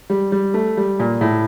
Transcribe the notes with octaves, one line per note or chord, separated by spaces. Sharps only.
G3
G3
A3
G3
A#2
A2